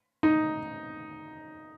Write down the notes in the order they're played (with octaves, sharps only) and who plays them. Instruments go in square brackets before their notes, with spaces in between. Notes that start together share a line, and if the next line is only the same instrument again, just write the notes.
[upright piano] D#4